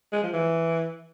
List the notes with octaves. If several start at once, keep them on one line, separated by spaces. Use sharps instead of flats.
G#3
F3
E3